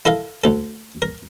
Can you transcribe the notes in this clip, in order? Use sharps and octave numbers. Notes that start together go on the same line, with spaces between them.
E4 A4 A#4 F5
D2 A4
A#4